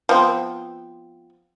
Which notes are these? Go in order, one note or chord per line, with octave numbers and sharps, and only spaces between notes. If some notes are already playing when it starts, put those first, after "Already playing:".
F3 B3 C4